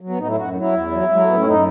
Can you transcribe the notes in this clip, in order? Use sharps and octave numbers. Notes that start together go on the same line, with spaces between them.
F#3
B3
A2 D#4
E4
F#2 F#4
F#3
E4
E2
F#3
F#3 G#3
A3
A2 B3
C#4
F#2 D#4